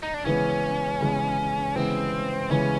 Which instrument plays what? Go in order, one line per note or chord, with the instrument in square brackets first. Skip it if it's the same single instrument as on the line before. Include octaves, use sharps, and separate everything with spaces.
[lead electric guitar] D#4
D4
[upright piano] C#3 E3 G#3 B3 [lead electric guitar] C#4
[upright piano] C#3 E3 G#3 B3
[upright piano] C#3 E3 G#3 B3 [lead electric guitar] C4
[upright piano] C#3 E3 G#3 B3 [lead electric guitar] C#4